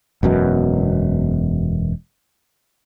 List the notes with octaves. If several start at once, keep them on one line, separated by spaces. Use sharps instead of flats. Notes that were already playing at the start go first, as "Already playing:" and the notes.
E1 F#2 B2